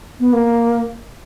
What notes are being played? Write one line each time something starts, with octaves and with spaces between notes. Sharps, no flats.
B3
A#3